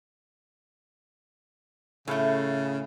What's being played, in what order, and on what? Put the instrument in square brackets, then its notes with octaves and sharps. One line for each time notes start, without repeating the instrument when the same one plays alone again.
[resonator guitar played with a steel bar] A2 A3 [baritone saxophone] C#3